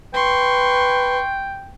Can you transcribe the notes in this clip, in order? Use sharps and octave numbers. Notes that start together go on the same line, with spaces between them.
B4 G5 C6 C#6